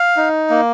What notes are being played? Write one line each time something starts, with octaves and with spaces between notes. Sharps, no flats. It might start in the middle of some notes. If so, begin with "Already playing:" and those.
Already playing: F5
D#4
A#3